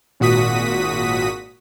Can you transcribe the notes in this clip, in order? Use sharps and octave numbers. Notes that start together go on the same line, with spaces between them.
G#1 A#2 F#4 D#6 B6 D#7